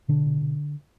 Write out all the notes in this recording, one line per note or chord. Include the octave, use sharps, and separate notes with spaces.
B2 D3 D4
B2
B2